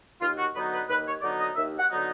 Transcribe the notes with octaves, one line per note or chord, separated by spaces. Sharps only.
D#2 F4
F#4
D3 F#3 B3 D#4 B4
B4
D#2 B4
C#5
D3 F#3 B3 D#4 D5
D#5
D#2 E5
F#5
D3 F#3 B3 D#4